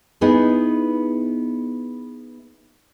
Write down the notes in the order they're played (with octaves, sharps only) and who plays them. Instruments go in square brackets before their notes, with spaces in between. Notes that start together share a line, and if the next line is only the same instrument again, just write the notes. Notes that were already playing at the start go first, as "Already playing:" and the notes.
[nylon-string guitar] B3 D#4 E4 G#4